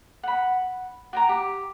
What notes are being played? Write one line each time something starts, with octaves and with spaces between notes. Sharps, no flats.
F#5 B5
F#4 G5 A#5
G4